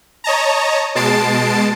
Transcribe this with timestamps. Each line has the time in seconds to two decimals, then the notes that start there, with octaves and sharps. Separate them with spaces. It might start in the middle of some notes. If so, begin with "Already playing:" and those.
0.24 C#5 D#5 A5 A#5
0.95 B2 G#3 A5 A6 C7 D7